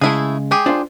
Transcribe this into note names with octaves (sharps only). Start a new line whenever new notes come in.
C#3 G#3 A3 E4 G#4
G#3 G4 G#4
D4 F4 C5